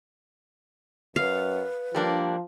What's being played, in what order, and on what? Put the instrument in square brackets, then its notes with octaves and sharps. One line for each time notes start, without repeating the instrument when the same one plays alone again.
[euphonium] F#2 [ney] B4 [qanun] F5
[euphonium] F3 [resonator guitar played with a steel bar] G3 A#3 D4